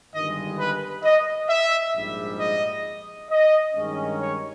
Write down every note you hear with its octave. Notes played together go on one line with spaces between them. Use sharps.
G1 G2 D#3 G#3 D#5
B4
D#5
E5
A#1 G#2 G3
D#5
D#5
G2 D#3 G#3 C#4
C#5